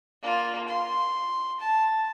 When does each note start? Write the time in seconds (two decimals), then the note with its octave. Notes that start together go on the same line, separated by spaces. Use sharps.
0.22 A#3 F4
0.68 C6
1.60 A5